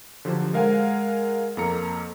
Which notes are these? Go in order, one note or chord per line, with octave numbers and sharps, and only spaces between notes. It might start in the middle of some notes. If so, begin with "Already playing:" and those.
D3 F3 F#3 G4 C5
G#3 A#4 F5 F#5 G#5
F2 A#3 A4 A#5 C#7